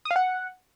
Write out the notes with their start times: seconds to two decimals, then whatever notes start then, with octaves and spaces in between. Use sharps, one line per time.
0.05 D#6
0.11 F5
0.16 F#5